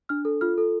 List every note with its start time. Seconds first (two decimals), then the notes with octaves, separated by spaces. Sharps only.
0.09 D4 F6
0.25 A4
0.41 F4 F6
0.58 A4